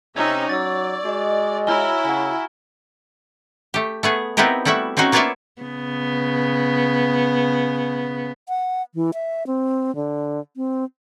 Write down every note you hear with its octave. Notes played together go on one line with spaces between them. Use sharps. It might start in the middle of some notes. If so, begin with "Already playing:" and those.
C3 C#4 D#4 E5 C#6 G#6
F#3 D5 E6 A6
G#3 F#4 D#5
E4 F#4 C#5 G#5 A#5 F6 G7
C#3 F#5 G#5
A3 G4
A3 B3 G#4
B3 C4 D#4 E4 G4 A#4
G3 A3 E4 F#4 E5
C4 C#4 D#4 F#4 C5
A#3 B3 F4 C#5 D5 E5
C#3 B3
F#5
E3
E5
C4
D3
C4